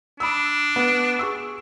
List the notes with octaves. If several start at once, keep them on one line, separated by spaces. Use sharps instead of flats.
D4 B5 D#6 E6
B3
G#4 C#6 E6